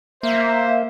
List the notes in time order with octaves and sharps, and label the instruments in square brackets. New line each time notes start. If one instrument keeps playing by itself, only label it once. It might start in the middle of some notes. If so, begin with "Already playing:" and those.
[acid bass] A#3 [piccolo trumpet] C5 [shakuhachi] E5